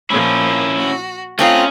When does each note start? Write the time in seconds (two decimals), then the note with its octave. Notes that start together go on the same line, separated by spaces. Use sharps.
0.10 A#2 F3 A#3 C#4 E4
0.78 F#4
1.39 A3 C4 C#4 F4 D#5 A#5 F#6